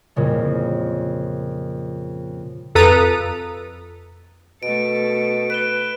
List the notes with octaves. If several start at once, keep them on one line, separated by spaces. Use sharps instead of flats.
F2 A#2 C#3 G3
F2 A4 B4 A#5 D#6 D#7
B2 A3 A4 D7
B4 D7 E7 G7